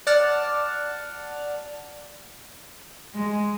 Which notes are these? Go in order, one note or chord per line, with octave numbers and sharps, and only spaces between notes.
D5 F#5 A5 F6
G#3